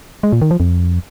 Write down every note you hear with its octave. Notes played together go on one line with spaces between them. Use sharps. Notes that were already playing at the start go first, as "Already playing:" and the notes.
G#3
A#2
D#3
F3
F2